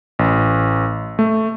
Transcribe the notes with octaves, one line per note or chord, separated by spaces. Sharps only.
A1
A3